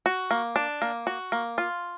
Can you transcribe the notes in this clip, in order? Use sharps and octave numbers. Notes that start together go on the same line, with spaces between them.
F#4
A#3
D4
A#3
F#4
A#3
F4